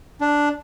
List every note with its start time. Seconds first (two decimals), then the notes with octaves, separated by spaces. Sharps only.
0.21 D4